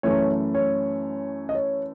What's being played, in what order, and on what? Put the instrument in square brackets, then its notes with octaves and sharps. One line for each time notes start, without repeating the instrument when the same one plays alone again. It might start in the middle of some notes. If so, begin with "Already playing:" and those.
[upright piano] F#2 E3 A3 C#5
C#5
D#5
C#5